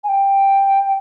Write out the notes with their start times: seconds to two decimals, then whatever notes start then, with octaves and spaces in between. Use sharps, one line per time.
0.04 G#5
0.09 G5